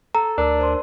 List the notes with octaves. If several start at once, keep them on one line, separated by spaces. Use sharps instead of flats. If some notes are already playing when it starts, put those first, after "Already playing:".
A4 A#5
D2 D4 A#4 A5 E6
C5 D5 C6